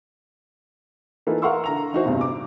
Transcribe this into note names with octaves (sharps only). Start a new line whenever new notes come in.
E3 A#3 D#4 F4 A4 B4
A#4 F5 F#5 C6 C#6 E6
D3 A#5 F7
E3 D#4 F#4 C5
E2 G2 C3
D6